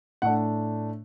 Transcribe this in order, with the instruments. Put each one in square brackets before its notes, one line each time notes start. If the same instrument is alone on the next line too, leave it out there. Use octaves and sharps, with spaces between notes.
[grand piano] A2 A3 D4 F#5